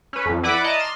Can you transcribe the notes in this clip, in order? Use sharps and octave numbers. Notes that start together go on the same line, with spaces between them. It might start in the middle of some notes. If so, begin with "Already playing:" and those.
C#4 B4
F2
E4 B4 D5 F#5 B5 D6
D5 D#5 A5 A#5
C6 F6